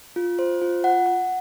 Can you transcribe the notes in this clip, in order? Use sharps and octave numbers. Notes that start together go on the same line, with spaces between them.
F4
C5
F4
F#5
F#5